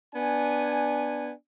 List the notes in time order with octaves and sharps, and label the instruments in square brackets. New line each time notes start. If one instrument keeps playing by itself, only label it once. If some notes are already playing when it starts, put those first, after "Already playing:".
[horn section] B3 D4 G#5